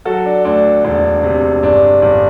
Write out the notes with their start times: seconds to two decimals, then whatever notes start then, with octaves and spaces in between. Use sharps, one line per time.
0.05 F#3 F#4 A4
0.26 D4
0.45 D2 D4
0.84 E1 D4
1.23 C3
1.63 G1 D4
2.02 G1